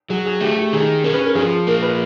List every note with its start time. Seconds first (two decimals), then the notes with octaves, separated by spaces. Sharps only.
0.09 F#3 G#4
0.25 G#4
0.40 A3 G4
0.57 G4
0.73 D#3 G#4
1.04 C#4 A#4
1.14 B4
1.25 A#4
1.35 F3 G#4
1.67 A#3 A#4
1.82 B4